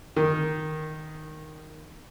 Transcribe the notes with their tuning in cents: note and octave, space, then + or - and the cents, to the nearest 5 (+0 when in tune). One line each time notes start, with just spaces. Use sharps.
D#3 +0